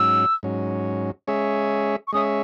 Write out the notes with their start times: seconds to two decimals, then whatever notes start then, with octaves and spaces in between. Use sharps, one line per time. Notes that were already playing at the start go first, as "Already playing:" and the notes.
Already playing: G#2 F#3 C#4 E6
0.43 G#2 F#3 C#4
1.28 G#3 C#4 G#4 C#5 E5
2.07 C#6
2.13 G#3 C#4 G#4 C#5 E5 D#6